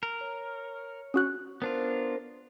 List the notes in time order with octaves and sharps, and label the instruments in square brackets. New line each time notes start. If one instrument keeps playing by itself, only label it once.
[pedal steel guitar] A#4
[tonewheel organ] C#5
[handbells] C#4 F#4 F#6
[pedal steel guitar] B3 D4 F4 [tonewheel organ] A#4 C5